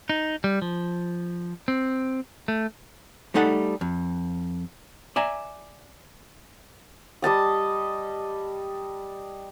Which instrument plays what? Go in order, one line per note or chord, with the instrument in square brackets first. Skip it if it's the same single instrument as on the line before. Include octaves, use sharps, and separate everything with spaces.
[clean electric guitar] D#4
G3
F3
C4
A3
[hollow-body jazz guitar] G3 A3 D#4 A4 F#5
F2
D5 E5 G#5 A#5
[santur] G3 D#5 A5 D#6